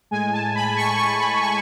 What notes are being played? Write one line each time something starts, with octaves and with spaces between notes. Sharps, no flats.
A2 G#3 G#5
A5
B5
C#6
C#6
B5
C#6